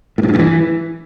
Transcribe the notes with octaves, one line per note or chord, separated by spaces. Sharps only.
A2
G2
A2
G2
E3